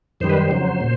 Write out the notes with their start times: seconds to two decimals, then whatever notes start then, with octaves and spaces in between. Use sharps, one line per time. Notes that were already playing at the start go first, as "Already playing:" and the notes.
0.20 F#2 D#3 G3 C5
0.29 B4
0.37 C5
0.51 F2 C#3 F#3
0.81 A#2